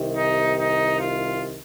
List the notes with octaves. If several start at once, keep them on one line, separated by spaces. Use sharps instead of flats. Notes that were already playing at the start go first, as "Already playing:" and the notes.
Already playing: C2 C3 D#3
D#4
D#4
F4